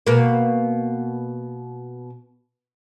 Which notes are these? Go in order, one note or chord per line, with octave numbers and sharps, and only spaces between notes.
B2 A#3